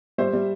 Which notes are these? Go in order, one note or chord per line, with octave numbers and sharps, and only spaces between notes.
G3 C5 E5
G3